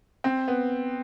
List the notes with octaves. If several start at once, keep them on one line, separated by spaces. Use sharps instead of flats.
C4
B3